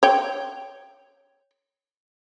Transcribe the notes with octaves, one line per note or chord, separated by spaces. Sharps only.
C#5 G5